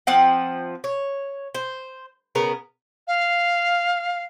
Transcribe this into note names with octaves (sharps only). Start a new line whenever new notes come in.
F3 C4 F#5
C#5
C5
C#3 B3 A#4
F5